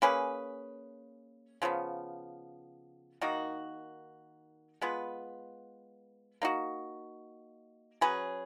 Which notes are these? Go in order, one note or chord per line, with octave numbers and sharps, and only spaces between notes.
A#3 C#4 G#4 B4
C#3 F3 B3
D#3 A#3 D#4 F#4
G#3 B3 F4 B4
A#3 D#4 F#4
F#3 C#4 G#4 B4